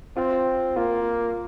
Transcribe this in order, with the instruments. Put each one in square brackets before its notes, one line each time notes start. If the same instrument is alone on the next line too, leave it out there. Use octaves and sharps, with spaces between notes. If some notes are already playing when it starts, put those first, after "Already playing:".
[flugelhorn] C4 [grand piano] F4
[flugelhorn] A#3 [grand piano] F4